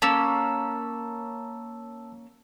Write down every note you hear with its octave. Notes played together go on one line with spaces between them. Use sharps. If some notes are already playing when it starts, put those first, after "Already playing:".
A#3 C#4 A5 E6